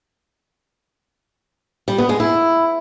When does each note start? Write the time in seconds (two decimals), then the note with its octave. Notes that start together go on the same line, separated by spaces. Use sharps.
1.88 G3
1.98 B3
2.09 G#3
2.20 E4